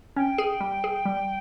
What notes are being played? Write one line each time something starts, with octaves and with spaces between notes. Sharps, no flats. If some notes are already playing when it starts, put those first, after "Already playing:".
C#4 G5
G#4
G3
G#4
G3